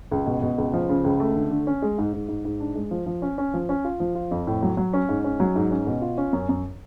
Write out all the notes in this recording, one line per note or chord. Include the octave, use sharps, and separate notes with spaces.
C#2
B2
B2
C#2
F3
C#3
C#2
A3
D3
D3
C#4
G#3
G#2
G#2
G#2
G#2
D4
G#3
F3
F3
C#4
C#4
F3
C#4
F4
F3
F4
F2
A2
F#3
F#3
C#4
G#2
C#4
F#3
G#2
C#4
B2
F4
C#4
F#2
F#2